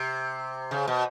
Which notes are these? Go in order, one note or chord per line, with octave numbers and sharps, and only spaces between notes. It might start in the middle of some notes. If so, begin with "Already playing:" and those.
Already playing: C3
C#3
B2